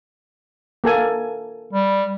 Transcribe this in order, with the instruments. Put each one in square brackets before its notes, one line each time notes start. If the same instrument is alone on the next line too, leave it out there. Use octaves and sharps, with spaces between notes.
[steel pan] A#3 A4 G#5
[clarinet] G3